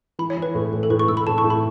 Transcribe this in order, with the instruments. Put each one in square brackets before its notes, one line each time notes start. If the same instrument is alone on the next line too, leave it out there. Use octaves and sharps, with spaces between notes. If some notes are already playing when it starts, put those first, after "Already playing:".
[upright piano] E3 [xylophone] B5
[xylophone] C#5
[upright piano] E3
[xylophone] B4
[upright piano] A2
A2
[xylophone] A4
[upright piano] A2 [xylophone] B4
[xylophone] C#6
[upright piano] A2 [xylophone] E6
[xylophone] B5
[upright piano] A2 [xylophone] A5
[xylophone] C#6
[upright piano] A2
[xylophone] B5